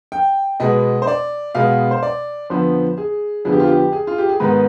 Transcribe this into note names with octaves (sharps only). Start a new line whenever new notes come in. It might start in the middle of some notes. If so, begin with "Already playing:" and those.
G5
B2 G#3 B3 D#5
C5
D5
B2 G#3 B3 F5
C5
D5
F2 D3 F3 B3 C5
G#4
F2 D3 F3 B3 G#4
G4
F4
G4
G#4
F4
G4
G#4
G#2 D#3 G#3 B3 B4